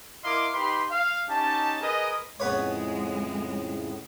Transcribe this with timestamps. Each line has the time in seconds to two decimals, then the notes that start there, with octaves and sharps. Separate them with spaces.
0.24 E4 A#4 D#5 F5 C6 D6
0.54 D#4 G4 B4 B5 C6
0.91 F5
1.29 C#4 D#4 G4 A5
1.81 G#4 A#4 B4 D#5
2.40 F2 A2 C#3 G#3 B3 B4 C#5